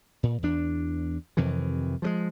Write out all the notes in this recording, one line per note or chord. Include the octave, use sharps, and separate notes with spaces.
A#2
E2 D4
F2 C3 D#3 E3
F3 F#3 G#3